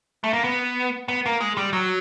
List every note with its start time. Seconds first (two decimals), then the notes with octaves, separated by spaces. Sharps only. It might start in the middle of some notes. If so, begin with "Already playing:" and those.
0.24 A3
0.33 A#3
0.44 B3
1.08 B3
1.26 A#3
1.41 G#3
1.57 G3
1.73 F#3